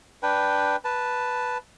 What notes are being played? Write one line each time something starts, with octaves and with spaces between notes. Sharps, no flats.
D4 B4 G5
B4 A5